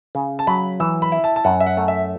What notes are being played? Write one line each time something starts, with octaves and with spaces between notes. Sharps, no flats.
C#3
A5
F#3 B5
E3 E6
B5
E4
A5
A5
F#2 F#5
E5
F#5
A3
E5